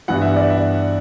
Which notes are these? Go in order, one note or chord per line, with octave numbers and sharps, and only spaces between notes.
G2 E3 B3 F#5
E5
D5
E5